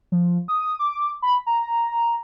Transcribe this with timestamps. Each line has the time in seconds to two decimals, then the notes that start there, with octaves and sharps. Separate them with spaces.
0.12 F3
0.48 D#6
0.79 D6
1.22 B5
1.47 A#5